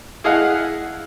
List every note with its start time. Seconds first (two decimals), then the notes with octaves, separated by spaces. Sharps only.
0.24 E4 G#4 D#5 F5 F#5